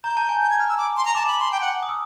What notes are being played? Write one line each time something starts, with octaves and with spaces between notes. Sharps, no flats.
A#5 G6
A5
G#5
G6
G#6
F6
E6
D6
C6
A#5
A5 D6
B5
C6
G5
F#5
D#6
E6